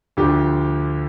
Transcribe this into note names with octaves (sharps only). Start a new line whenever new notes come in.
D2 D3 F3 G4